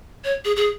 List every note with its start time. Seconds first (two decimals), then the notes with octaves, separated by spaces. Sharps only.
0.24 C#5
0.45 G#4
0.56 G#4